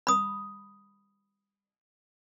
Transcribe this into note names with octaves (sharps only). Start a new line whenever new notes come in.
B5 D#6